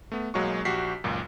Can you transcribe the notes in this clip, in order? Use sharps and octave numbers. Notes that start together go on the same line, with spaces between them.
A3 B3
B1 F#3 G#3 A#3 F#4 C#6
A#1 F#4 G4 B6 C7
G#1 C#2 F#2 A#2